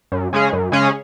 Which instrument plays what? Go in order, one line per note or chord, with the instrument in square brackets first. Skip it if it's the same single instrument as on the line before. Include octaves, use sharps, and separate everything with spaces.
[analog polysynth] F#2
C#3 G#3 C#4 G#4
F#2
C#3 G#3 C#4 G#4